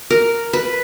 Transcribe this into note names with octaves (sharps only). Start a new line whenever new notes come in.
A#4
B4